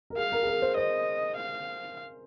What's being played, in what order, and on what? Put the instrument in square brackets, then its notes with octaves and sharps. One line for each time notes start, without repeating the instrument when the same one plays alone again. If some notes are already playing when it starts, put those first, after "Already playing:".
[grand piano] A#4
[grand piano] G#4 [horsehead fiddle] F5
[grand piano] A#4
G#4
A#4
C5
[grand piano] C5 [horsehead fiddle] D#5
[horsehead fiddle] F5